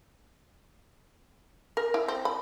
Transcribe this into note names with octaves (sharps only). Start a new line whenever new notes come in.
A#4
E4
C4
B5